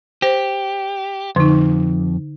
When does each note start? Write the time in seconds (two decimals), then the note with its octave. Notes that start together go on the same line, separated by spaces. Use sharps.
0.22 G4 C5
1.36 F2 D3 D#4